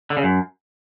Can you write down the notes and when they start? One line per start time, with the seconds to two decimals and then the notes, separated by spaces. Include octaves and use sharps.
0.10 D3
0.17 C#3
0.23 F#2